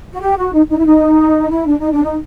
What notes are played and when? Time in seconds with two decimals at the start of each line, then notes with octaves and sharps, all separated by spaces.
0.13 F#4
0.21 G4
0.38 F#4
0.53 D#4
0.70 D#4
0.78 E4
0.85 D#4
1.51 E4
1.67 D4
1.79 D#4
1.92 D4
2.04 D#4